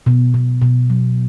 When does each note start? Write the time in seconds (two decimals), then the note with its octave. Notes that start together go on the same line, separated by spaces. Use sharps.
0.06 B2
0.34 B2
0.62 B2
0.90 F#3